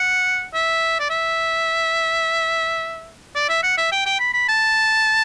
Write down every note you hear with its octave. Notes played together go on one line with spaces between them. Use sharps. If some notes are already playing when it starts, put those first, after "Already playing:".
Already playing: F#5
E5
D5
E5
D5
E5
F#5
E5
G5
G5
B5
B5
A5